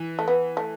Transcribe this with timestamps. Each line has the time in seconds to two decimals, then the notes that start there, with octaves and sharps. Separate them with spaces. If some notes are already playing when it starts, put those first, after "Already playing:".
Already playing: E3
0.19 A3
0.28 B3
0.57 A3